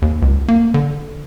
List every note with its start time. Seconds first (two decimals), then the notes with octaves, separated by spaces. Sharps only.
0.02 D#2
0.22 C#2
0.48 A#3
0.74 D3